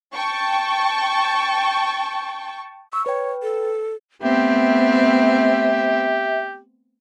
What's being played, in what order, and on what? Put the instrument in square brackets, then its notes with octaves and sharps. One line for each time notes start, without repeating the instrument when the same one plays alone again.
[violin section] G5 A5 C#6
[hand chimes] C#6 [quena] E6
[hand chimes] B4 G5 [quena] C#5
[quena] A4
[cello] A3 C4 [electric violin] B3 [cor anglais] G4 [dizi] E5